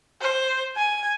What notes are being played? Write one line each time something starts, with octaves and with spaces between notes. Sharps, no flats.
C5
G#5